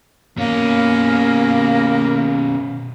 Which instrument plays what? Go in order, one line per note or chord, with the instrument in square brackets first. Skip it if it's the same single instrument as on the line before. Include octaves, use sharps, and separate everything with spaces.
[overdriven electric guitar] B2 C#4 [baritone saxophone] A#3